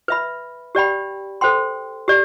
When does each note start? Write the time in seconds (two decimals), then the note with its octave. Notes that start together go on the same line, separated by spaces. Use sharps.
0.08 B4 E5 B5
0.75 G4 D5 G5 B5
1.41 A4 C5 G5 C6
2.08 G4 D5